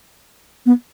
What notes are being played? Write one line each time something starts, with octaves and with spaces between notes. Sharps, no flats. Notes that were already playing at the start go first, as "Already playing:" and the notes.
B3